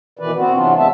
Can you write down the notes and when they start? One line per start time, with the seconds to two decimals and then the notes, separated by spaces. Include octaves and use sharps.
0.19 B2 D#3 E3 B4 D5
0.36 B3 C4 F#4
0.54 C3 E3 F#3 B3 D4 F4
0.78 F#2 G#3 B3 E5 A5